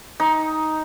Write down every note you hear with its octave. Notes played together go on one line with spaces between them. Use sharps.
D#4